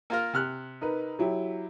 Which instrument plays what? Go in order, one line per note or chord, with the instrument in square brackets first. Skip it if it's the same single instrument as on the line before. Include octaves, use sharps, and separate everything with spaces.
[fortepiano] A#3 F4 A#4
C3 F6 F#6
[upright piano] D#4 A#4 B4
F#3 E4 G4